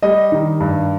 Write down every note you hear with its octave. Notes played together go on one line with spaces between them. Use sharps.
G3 D#5
D#3
G2